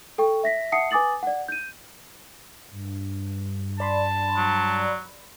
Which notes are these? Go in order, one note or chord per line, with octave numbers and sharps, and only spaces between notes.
A4 G5 C#6
E5 A#6 B6
E5 F#5 A5 D#6 C7 C#7
B4 G#5 D6 D#6 A6 F#7
D5 F#5
G6 D#7
G2
D5 A5 B5 C6
F#3